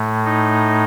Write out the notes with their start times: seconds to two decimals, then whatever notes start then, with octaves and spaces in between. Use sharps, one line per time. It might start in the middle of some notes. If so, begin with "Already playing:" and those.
Already playing: A2 A3
0.24 D#4